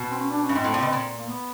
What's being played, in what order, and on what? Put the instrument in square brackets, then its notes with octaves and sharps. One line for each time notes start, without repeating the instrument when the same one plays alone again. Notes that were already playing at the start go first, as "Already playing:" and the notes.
Already playing: [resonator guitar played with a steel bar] B2
[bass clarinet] C4
C#4
D4
C#4
[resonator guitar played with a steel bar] G2
[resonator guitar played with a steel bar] G#2 [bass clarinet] C4
[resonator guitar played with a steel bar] A2
A#2
B2
A#2
[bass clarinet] A#3
B3